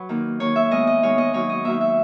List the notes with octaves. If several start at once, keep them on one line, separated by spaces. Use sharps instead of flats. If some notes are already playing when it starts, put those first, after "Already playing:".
Already playing: F#3 B4
D#3 A#3
D#3 A#3 C#5
E5
D#3 G#3 B3 D#5
D#5
D#3 G#3 B3 C#5
D#5
D#3 F#3 A#3 C#5
D#5
D#3 F#3 A#3 E5
E5